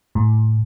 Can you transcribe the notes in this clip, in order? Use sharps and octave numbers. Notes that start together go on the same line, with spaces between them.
A2